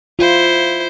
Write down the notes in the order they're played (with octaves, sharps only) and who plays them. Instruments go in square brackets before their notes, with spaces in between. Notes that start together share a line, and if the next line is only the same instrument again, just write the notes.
[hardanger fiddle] E4 C5 [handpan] F4